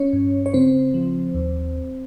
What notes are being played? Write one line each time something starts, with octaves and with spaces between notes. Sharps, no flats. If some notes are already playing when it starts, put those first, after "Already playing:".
Already playing: C#4 C#5
G2
C#5
C#3 C4 C5
F3
D#2